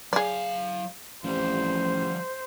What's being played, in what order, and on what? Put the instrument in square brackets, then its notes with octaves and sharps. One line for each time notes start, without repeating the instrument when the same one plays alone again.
[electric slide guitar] F#3 F5 [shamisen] G#4 D5
[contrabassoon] A1 [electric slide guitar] F3 G3 G4 [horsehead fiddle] C5